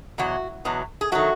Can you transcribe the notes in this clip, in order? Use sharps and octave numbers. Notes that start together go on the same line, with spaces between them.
E2 B2 F#3 F#4
E2 B2 F#3
G#4
D#3 F#3 A3 F#4